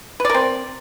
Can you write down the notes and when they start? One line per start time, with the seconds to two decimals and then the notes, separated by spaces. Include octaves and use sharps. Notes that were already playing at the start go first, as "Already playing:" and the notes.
0.20 B4
0.25 D5
0.30 A#4
0.34 C4